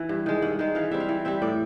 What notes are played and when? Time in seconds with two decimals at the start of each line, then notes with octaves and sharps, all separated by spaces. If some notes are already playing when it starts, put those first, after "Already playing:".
Already playing: E3
0.09 G2
0.26 D#3 G#3
0.42 G2 F#5
0.59 D#3 G#3
0.75 E3 F5
0.91 G3 C4 E5
1.00 F5
1.09 E3
1.25 G3 C4 E5
1.42 A2 D5